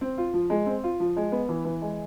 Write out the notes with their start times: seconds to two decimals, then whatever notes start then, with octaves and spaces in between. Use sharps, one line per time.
0.01 C4
0.18 F4
0.34 F3
0.50 G#3
0.66 C4
0.84 F4
1.00 F3
1.16 G#3
1.32 B3
1.49 E3
1.65 E3
1.82 G#3